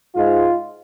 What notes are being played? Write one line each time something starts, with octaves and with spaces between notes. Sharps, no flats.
G#2 G#3 F4